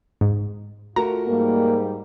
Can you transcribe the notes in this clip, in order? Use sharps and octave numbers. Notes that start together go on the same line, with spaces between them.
G#2
A3 F4 F#4 A#4 A#5
G#2 G3 A#3